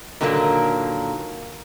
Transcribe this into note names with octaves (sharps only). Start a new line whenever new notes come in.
A#2 D3 D#3 F#3 A3 A#3